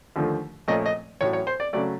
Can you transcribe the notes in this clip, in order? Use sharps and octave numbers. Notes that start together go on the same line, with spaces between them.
D#2 D3 F3 A3
A#2 F3 A3 C#4 D#5
D#5
A1 A2 F#3 C#5
C#5
C5
D5
C#3 F#3 A3 D5